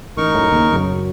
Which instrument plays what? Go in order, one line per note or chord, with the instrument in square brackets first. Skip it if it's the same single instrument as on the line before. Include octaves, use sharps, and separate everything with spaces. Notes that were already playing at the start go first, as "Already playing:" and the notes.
[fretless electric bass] A1 [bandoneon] D#4 A#4 C#6
[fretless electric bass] F#2 A2
D#2 C#3
F#2 C#3 F#3